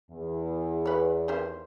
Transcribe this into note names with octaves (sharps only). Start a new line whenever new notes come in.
E2
B4 C#5
D#3 G4 C5